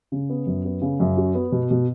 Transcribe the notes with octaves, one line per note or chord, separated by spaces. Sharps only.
C#3
B3
F#2
B3
C#3
F#2
F#4
B3
B2
B2